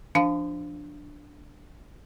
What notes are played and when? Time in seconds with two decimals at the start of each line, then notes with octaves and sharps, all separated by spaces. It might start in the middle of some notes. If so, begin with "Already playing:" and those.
0.15 F3 D4